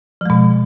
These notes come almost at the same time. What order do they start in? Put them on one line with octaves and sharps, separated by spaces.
F3 G#3 B2